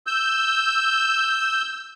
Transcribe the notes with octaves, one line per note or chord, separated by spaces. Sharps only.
E6 G6